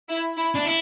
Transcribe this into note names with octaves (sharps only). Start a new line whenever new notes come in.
E4
E4
D4
E4